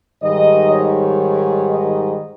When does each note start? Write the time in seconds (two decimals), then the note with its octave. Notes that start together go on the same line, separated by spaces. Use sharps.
0.23 G#2 D#3 G3 D#5
0.71 C#5
1.68 D#5